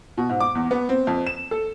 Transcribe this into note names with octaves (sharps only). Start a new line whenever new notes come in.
B2
G#2
D6
E2
B3
C4
F2
E7
A4